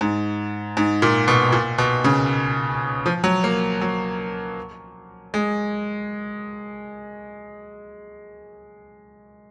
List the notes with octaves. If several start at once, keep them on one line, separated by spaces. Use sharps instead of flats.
G#2
G#2
A#2
B2
A#2
B2
C#3
F3
F#3
A#3
F#3
G#3